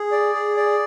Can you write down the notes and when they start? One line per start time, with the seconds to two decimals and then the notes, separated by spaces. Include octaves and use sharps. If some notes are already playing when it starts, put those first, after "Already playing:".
Already playing: G#4
0.12 D5
0.34 G#4
0.57 D5